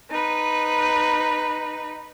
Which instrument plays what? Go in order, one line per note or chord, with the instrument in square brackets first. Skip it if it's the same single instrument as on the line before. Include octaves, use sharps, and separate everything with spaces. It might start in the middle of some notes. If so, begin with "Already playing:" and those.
[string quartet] D#4 B4